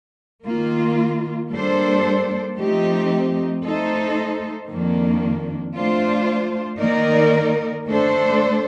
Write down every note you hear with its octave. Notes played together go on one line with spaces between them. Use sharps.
D#3 A#3 F4
G3 A#3 D4 A4 C5
F3 A3 C4 D#4 G4
A3 D#4 A4 C5
F2 D#3 A#3 D4
A3 D4 F4 C5
D#3 A#3 D#4 A#4 D5
D3 A3 D4 A4 C5